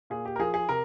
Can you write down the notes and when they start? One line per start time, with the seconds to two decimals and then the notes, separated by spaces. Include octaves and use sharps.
0.10 A#2 G#4
0.25 G4
0.36 A#4
0.39 F3 G#4
0.54 G#4
0.69 C3 A#4